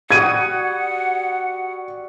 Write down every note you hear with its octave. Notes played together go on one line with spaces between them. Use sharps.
G3 F#4 F#5 D#6 G#6 D#7